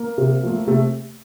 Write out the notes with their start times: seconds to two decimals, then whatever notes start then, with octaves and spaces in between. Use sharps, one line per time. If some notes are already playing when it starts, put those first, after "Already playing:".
Already playing: A#3
0.18 C3
0.43 F3 A3
0.67 C3 A3